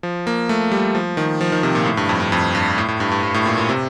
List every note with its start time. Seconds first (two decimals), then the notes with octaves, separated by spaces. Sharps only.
0.03 F3
0.27 A#3
0.49 A3
0.72 G3
0.95 F3
1.17 D#3
1.41 F3
1.52 D#3
1.63 C3
1.75 A#2
1.85 A2
1.97 G2
2.09 F2
2.20 G2
2.32 F2
2.55 G2
2.78 A2
2.88 A2
3.00 G2
3.11 G2
3.23 G2
3.34 A2
3.46 A#2
3.58 A#2
3.69 C3